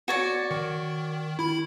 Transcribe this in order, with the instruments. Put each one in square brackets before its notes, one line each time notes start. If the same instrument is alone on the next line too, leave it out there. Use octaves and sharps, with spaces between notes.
[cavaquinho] F#4 C#5 D5
[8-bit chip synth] D#3
E4 B5